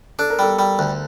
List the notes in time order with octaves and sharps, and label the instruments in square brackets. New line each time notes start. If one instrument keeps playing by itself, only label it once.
[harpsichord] D4 [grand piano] A4
[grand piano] A#4
[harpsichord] G3 [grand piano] A4
[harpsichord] G3
D2